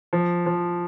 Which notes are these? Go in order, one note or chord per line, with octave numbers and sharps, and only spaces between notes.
F3
F3